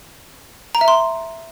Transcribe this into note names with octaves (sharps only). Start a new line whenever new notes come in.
A#5
E5
C6